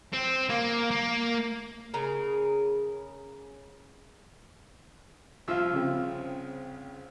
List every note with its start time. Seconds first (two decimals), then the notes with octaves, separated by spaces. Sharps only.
0.13 C4
0.49 A#3
0.91 A#3
1.94 C#3 G#4 A#4
5.48 C2 F3 F4 F5 E6
5.73 C#3 C4